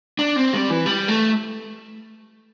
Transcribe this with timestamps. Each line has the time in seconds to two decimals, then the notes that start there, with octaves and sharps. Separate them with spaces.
0.19 D4
0.36 C4
0.53 G3
0.70 E3
0.86 G3
1.08 A3